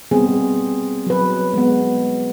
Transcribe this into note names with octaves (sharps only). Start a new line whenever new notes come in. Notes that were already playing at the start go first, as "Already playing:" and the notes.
G3 B3 C4 G#4
F#3 B4
G#3 B3